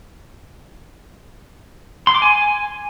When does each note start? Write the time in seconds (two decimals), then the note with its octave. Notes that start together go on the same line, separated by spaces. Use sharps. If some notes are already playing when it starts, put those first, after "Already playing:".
2.07 C6
2.15 D6
2.22 G#5